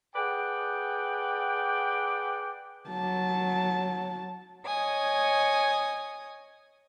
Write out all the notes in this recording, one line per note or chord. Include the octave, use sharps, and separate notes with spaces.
G#4 B4 D5 F#5 G5
F#3 A5
C#5 D#5 G#5 D#6